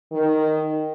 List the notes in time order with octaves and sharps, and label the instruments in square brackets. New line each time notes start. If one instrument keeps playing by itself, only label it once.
[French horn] D#3